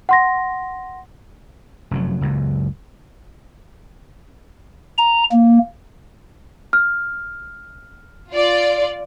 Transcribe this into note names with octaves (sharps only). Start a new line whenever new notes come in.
F#5 C6 A#6
F1 F#2 F#3
F#1 C#2 F#2
A#5
A#3
F6
F4 D5